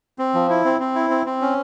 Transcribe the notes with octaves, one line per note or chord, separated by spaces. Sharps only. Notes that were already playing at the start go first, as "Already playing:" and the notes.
C4
F3
E4
C4
C4
E4
C4
C4
C#4